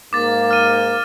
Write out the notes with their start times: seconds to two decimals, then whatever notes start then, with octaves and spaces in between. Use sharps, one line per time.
0.13 G#2 A#3 D6 A6
0.51 F6 D#7